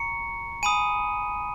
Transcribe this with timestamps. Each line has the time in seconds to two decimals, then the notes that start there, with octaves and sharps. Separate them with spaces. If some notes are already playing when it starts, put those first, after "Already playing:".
Already playing: A#5 C#6 C#7
0.63 G#5 B5 D#6 D#7